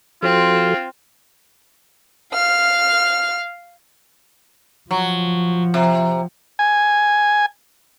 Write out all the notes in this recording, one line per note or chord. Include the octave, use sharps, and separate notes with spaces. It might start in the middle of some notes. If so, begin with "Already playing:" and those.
F3 C4 F4 F#4 A4
F5 F6
F3 F#3
C3
G#5